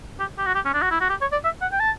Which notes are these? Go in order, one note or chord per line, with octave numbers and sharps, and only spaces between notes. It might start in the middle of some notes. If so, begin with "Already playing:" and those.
G4
G4
F#4
G4
C#4
D4
F#4
E4
F#4
G4
C#5
D5
E5
F#5
G5
A5